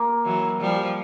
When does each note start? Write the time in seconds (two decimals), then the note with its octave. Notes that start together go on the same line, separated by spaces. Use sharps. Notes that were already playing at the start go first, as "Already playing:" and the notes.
Already playing: A#3
0.24 E3 F#3
0.61 F3 G3